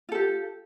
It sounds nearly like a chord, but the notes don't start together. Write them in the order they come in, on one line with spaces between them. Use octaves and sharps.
F4 A4 G4